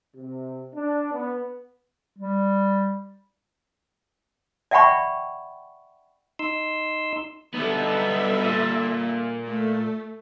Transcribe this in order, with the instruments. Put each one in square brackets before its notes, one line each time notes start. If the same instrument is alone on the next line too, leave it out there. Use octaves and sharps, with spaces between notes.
[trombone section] C3
D4
B3
[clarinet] G3
[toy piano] D5 E5 F#5 G5 B5 C#6
[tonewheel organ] D#4 C6 E6
[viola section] D3 G3 E5 [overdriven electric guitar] B3 D#4
[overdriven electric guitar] A#2
[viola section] A3